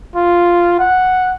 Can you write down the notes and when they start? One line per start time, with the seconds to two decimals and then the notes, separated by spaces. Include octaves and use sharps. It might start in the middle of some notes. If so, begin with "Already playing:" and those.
0.16 F4
0.79 F#5